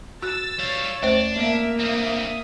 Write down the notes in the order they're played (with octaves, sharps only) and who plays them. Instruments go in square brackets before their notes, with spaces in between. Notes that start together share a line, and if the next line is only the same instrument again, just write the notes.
[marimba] F#4 F#6 [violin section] E6 A6
[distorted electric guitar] G3 F5 [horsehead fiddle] C#5
[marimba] D#2 A3 C5 [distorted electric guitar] D4
[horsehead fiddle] A#3 [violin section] E5
[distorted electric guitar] G2 C4 [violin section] E5 D#6